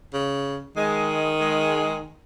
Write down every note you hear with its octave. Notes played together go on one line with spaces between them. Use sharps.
C#3
D#3 G#3
G#3